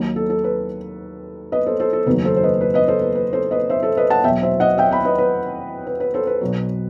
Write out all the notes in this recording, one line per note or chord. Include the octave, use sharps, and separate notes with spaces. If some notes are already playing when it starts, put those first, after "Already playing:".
Already playing: D#2 D#3 F#3
A4
A4
B4
B4 D#5
A4 C5
A4 C5
A4
F#1 E2 D#3 F#3 B4
A4 C5
C5
B4 D#5
B4
B4 D#5
A4 C5
B4
B4
A4 C5
B4 D#5
C5 E5
A4 C5
B4 D#5
F#5 A5
E2 B2 F#3 E5 G5
C5 E5
D#5 F#5
E5 G5
G5 B5
B4 D#5
B4
B4
B4
A4 C5
B4
B1 B2 F#3